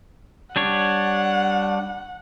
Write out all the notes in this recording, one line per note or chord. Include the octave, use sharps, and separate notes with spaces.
G3 D4 C#5 F#5